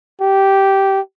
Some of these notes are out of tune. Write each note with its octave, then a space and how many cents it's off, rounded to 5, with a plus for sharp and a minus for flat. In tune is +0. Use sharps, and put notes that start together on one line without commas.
G4 -10